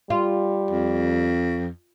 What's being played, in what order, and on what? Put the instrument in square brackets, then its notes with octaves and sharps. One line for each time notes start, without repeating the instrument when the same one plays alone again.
[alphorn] G3 [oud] F4
[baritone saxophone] F2